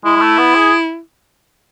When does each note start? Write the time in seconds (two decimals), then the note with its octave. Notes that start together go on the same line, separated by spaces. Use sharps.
0.04 G#3 E4
0.16 G#3
0.21 A3
0.38 B3
0.55 G#4